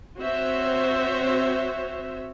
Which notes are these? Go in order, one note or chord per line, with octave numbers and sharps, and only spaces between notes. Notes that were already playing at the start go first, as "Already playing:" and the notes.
C4 F#4 C5 C#5 E5